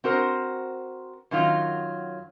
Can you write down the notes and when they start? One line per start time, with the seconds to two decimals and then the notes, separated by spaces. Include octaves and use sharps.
0.04 C4 F#4 A#4 C5
1.31 F#2 D#3 F#3 F4